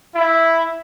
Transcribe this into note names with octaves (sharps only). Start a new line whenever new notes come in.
E4